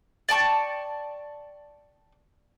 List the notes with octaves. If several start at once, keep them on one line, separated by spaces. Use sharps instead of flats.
D5 G5 A5 C#6